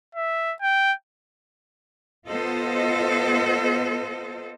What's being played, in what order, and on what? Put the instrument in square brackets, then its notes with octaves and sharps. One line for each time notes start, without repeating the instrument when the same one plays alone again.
[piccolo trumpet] E5
G5
[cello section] B3 F4 A4 C5 D#5